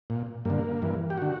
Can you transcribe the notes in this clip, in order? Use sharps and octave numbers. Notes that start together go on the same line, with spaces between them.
A#2
G2 D3 A#3
G2 E3
G4
D3 F#4